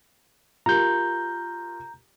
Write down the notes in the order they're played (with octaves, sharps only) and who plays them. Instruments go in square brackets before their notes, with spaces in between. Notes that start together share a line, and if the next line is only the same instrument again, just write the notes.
[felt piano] F4 G4 A#4 [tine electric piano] A#5 G6